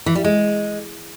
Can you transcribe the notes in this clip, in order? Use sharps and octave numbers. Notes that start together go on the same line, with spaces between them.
E3
G3
G#3